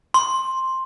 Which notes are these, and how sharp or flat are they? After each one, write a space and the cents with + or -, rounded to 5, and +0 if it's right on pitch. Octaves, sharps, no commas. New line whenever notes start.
C6 +5